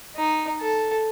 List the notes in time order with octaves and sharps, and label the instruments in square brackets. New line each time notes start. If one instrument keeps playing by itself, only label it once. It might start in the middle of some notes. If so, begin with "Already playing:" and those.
[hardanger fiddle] D#4
A4